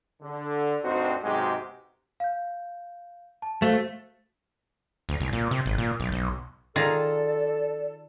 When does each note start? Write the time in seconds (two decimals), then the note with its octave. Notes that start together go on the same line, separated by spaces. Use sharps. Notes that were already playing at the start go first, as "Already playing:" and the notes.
0.22 D3
0.83 D2 G2 C4 D#4 F#4 C5
1.23 B1 G#2 C3 G#3 F#4 G4
2.20 F5 G6
3.42 A5
3.62 A3 F#4 C5 F5
5.09 D2
5.20 C2
5.33 A#2
5.51 C3
5.66 G#1
5.78 A#2
6.00 B1
6.12 B1
6.76 D#3 F4 G#4 A4 D5 A#5